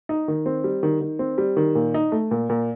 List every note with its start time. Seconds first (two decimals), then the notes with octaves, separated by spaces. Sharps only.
0.09 D#4
0.28 D#3
0.46 C4
0.64 G3
0.83 D#3
1.01 D#3
1.19 C4
1.38 G3
1.57 D#3
1.75 A#2
1.94 D#4
2.12 A3
2.31 A#2
2.50 A#2